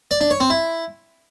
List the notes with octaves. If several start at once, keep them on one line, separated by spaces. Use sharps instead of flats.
D5
D4
C#5
C4
E4